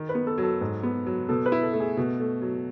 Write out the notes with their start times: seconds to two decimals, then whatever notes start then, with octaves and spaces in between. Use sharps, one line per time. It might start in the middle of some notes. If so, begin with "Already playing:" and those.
Already playing: D#3
0.09 B4
0.15 B3
0.27 A4
0.38 F#3
0.43 A4
0.61 G#2
0.83 B3
1.06 F#3
1.29 B2 A4
1.46 B4
1.52 E4
1.62 A4
1.74 A3
1.80 G#4
1.97 B2 F#4
2.20 A3
2.42 F#3